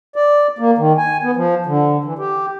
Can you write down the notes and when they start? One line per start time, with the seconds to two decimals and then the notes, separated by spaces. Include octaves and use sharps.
0.16 D5
0.59 A#3
0.78 D#3
0.97 G#5
1.23 B3
1.36 F3
1.66 D3
2.04 E3
2.19 G4